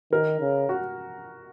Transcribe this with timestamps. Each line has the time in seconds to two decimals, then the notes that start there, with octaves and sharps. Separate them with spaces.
0.12 D#3 A#4
0.41 C#3
0.69 F#4